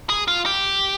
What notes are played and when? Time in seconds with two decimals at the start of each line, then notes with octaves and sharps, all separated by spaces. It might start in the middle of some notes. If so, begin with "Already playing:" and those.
0.09 G#4
0.28 F4
0.46 G4